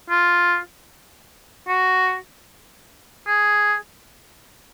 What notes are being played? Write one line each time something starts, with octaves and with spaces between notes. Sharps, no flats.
F4
F#4
G#4